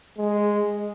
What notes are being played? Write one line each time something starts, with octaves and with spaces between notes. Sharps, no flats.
G#3